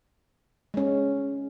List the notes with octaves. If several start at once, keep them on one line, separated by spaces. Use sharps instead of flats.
G#3 C#4